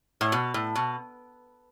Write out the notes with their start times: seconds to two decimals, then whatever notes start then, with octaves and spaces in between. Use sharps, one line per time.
0.21 A2
0.32 B2
0.54 A2
0.76 B2